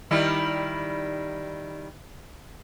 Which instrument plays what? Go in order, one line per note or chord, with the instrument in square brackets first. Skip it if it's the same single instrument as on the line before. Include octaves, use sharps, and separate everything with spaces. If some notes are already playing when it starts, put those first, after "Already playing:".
[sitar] D#3 G3 E4